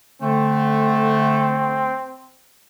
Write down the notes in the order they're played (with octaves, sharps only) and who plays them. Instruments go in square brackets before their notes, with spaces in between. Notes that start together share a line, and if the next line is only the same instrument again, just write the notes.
[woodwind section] D3 A3 [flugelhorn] C4